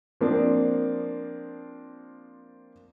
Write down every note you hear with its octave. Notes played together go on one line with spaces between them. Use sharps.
F3 A#3 C4 D4